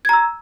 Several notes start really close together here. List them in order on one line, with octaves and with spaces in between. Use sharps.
G#6 A#5 E6